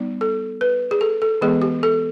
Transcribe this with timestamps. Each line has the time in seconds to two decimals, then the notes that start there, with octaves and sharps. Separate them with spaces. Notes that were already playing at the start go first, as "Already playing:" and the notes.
Already playing: G3 B3 D#4
0.21 A4
0.61 B4
0.91 G#4
1.01 A4
1.22 A4
1.41 E3 G#3 B3 G#4
1.62 G4
1.83 A4